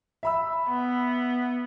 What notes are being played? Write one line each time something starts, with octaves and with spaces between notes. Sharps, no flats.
E5 B5 E6
B3